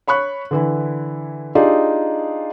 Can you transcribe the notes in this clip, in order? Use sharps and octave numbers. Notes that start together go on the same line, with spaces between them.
C#5 B5 C#6 F#6
D3 E3 E4
D4 D#4 F4 G4 G#4 D5